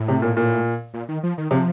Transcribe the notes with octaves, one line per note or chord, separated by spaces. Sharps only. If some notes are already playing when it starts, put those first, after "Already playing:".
Already playing: A2
C3
A#2
A#2
A#2
D#3
F3
D#3
C3 F3